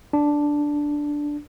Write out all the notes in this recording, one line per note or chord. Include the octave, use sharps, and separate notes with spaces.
D4